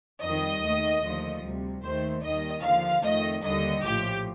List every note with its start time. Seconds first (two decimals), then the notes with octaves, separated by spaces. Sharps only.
0.21 F2 D#3 G3 D#5
0.62 D#2 D#3 A3
1.02 D#2 D3 F3 A3
1.42 D2 C3 G3
1.82 D#2 D#3 A3 C5
2.22 D#2 D#3 G3 D#5
2.63 D#2 D3 F3 F5
3.03 F2 D#3 A3 D#5
3.43 D#2 D3 G3 D#5
3.84 A#1 A2 F3 G4